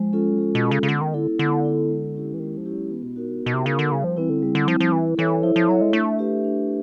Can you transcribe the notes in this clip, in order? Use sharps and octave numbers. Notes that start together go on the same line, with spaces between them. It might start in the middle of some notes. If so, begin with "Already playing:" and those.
Already playing: F3 G#3
C#4 F4 A4
F#3
F3 G#3
B2
C#4 F4 A4
C#3
C#3
D3 B3
D#3
D3 E4 A4
D3 B3
E4 A4
G#3
C#4 E4 G4
E3
D#3 G#3
F3
C#4 E4 G4
F#3
E3 B3
B2
A#2 D#4 F#4 A#4
C3
B3
B2
C3
C#3 D#4 F#4 A#4
D3
C#3 G3
F3
E3 C4 E4
D3
C#3 G3
D3
F3 C4 E4
F3
E3 E4
E3 A4 C#5 E5
F3 E4
F3
F#3 A4 C#5 E5
G#3
A3 D4
G4 B4 E5
D4